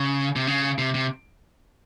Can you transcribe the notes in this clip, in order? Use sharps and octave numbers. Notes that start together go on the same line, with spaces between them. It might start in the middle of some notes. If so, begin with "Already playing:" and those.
Already playing: C#3
C3
C#3
C3
C3